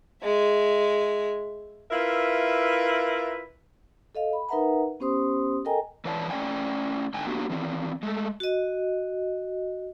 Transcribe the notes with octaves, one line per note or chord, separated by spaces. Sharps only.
G#3 E5
E4 F4 A#4 B4 E5
A4 D#5 F5
B5
D#4 A#4 B4 E5 F#5 A#5
B3 C#4 G4 C5 C6 D#6
A4 A#4 D#5 G5 G#5 A#5
E3 B4 C#5 D5 F5 A5
A3 C#4 D5 G5 G#5
G#2 D3 G5 G#5
A#3 B3 D4 F#4 G4
D#3 E3 C4
G#3 A3
F#4 D#5